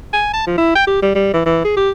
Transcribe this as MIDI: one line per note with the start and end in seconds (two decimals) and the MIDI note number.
0.13 0.29 80
0.33 0.43 81
0.46 0.58 53
0.58 0.74 64
0.75 0.82 79
0.87 0.99 67
1.02 1.14 55
1.15 1.33 55
1.33 1.41 52
1.46 1.62 52
1.65 1.76 68
1.77 1.90 67